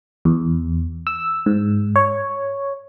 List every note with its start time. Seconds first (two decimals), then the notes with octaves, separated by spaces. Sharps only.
0.25 E2
1.07 E6
1.46 G#2
1.96 C#5